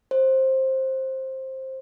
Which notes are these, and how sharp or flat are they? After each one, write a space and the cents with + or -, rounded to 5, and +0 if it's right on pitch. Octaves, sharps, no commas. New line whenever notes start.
C5 +15